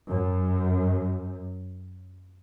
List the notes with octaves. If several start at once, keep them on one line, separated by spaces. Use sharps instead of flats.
F#2